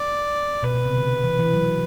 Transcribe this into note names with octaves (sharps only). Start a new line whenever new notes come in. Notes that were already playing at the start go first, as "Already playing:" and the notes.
Already playing: D5
B2 B4
B2
C3
D3
E3
E3
F#3